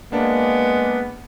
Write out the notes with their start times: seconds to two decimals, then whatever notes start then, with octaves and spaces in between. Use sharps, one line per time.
0.12 G#3 A#3 B3 D4